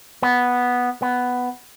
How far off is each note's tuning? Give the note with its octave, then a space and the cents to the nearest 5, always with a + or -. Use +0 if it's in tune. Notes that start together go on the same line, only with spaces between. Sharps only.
B3 -5
B3 +5